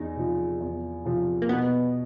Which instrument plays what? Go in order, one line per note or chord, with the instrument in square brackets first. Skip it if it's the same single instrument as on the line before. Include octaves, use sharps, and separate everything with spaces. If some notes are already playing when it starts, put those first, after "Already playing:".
Already playing: [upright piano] E2 [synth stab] D#4
[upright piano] C3 F3
E2
C3 F3
[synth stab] A#3
[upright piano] B2 [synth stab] B3